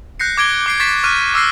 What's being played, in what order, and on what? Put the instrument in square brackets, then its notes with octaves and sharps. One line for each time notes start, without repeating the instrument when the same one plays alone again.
[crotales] F#6 G6 A#6 C7 C#7
D6 G#6 D7 G7
D6 C7 D7
C#6 G#6 A6 B6 C7 E7
C#6 D6 F6 F#6 D#7
D6 E6 F6 A#6 C7